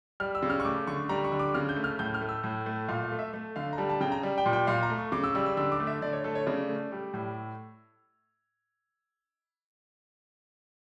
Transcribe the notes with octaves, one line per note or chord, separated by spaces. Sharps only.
G3 F6
E6
C#3
F6
C#6
A3 D6
D3 C#6
G3 A#5
C#6
D3
D6
C#3 F6
G6
A3
F6
A2 G6
F6
A3
E6
A2
A3
A#2 F5
F5
A3
E5
A3
D3 F5
A#5
G3 A5
A5
C#3 G5
A#5
G3
G5
A#2
G5
A#2 F5
A#5
A3
C#6
C#3 D6
E6
G3 E6
E6
D3 E6
D6
A3
E5
D3 D5
C#5
A3 A4
C#5
C#3 D5
A3
G3
A2